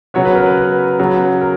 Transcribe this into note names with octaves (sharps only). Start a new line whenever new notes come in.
C#3 F#3 B3 C#5
B4
A#4
B4
B4
C#3 F#3 B3
A#4